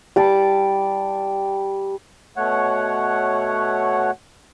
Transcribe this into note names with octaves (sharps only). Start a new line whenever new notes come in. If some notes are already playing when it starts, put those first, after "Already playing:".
G3 A5 D6
B2 A3 C#5 F#5